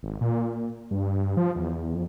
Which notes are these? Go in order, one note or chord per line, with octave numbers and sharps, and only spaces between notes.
G#1
A#2
G2
F3
E2
F2